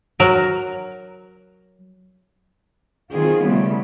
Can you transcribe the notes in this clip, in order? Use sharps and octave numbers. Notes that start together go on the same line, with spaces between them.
F#3 A#4
D#3 F#3 C4 F4 G#4
C#3 E3 G3 A3 B3